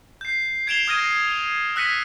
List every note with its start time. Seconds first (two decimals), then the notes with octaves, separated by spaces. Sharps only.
0.21 G6 C7
0.67 G#6 C7 D7 E7 F7 G7
0.88 D#6 F6 G#6 A#6 D#7
1.76 E6 F#6 A#6 B6 C#7 D#7